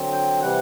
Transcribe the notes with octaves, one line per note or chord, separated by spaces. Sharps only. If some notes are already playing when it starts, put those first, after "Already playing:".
Already playing: D3 F#3 C4
G5
C3 E3 G3 F#5